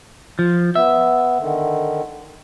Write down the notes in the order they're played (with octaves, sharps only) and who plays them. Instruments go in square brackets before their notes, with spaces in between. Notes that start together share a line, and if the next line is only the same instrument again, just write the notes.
[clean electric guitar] F3
[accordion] B3 [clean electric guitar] E5
[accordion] D3 D#3